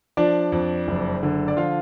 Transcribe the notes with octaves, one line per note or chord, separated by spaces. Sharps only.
F3 D4 D5
F2
F#1
D3
D5
F3 F4 F5